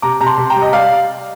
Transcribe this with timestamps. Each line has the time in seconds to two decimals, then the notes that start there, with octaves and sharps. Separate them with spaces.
0.02 C3 A#5 D6
0.20 C3 A#5
0.26 A5 C6
0.38 C3
0.50 G5 A#5
0.56 G3
0.62 D#5
0.73 G3 D5 F5